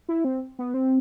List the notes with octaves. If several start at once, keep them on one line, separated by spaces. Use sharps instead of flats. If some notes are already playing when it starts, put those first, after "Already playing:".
E4
C4
B3
C4